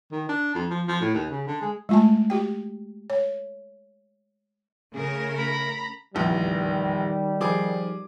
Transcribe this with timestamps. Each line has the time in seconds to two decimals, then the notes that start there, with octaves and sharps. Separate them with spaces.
0.11 D#3
0.29 D4
0.54 F2
0.70 F3
0.88 F3
1.01 A2
1.14 D#2
1.30 C#3
1.47 D3
1.61 G#3
1.89 G#3 A3 F4 G#5 A5
2.30 F#4 G4 G5
3.10 C#5
4.95 C#3 A3 G#4 A#4
5.37 A#5 B5
6.15 F1 A#1 E2 D#3 G3
7.41 F3 G#4 D6